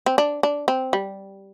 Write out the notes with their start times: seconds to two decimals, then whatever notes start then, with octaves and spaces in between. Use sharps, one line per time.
0.06 C4
0.18 D4
0.43 D4
0.68 C4
0.93 G3